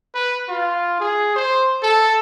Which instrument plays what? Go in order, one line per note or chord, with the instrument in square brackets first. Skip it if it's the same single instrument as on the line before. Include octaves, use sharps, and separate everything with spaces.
[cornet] B4
F4
G#4
C5
A4